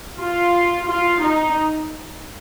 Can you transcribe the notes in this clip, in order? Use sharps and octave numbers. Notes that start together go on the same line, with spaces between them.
F4
F4
D#4